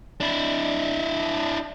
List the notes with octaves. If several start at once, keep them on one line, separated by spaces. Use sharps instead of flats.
D4 E4